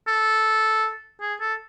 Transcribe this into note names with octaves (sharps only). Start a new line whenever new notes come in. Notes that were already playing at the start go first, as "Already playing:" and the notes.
A4
G#4
A4